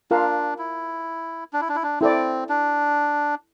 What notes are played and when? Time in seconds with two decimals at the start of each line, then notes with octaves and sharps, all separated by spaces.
0.11 D4 F4 A#4 F5
0.58 E4
1.53 D4
1.61 E4
1.69 D4
1.76 E4
1.83 D4
2.01 C4 E4 A4 D5
2.49 D4